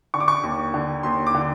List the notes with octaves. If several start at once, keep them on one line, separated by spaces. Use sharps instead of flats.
D3 C#6
D6
C#6
D#2
D3
D#2 C6
D6
D3